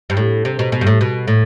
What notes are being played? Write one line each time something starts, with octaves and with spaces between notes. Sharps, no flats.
G2
A2
C3
B2
B2
G2
A2
B2
A2